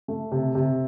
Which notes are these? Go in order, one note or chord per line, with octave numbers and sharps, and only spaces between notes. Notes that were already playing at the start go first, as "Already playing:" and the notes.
A3
C3
C3